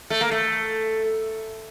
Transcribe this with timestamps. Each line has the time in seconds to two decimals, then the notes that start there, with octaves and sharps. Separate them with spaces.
0.10 A3
0.21 A#3
0.31 A3